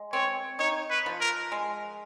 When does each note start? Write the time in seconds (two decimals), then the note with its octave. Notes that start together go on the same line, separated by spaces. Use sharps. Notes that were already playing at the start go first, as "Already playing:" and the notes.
Already playing: G#3
0.12 C4 C#5
0.59 D#4 C#5
0.90 B4
1.06 F3
1.21 A#4
1.52 G#3